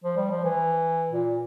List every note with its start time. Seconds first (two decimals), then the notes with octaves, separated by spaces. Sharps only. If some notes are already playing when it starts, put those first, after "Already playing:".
0.04 F3
0.16 G3
0.31 F3
0.44 E3
1.11 A#2